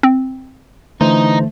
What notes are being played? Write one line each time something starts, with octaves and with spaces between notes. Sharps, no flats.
C4
D3 E3 A3 D#4 C5